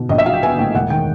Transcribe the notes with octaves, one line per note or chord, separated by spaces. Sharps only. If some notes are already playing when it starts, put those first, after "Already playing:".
Already playing: B2
A#1 D#5
E5
F#3 F5
G5
B3 G#5
A2 G5
E1 F#5
D#3 G5